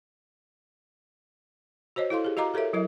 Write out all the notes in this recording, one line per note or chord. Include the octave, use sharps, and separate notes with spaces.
F#4 C5 C#5 D#5
E4 A4 F5 C6
G4 G#4
F#4 D#5 F5 A#5 D6
G4 A4 A#4 C#5 E5
F#3 E4 A#4 D#5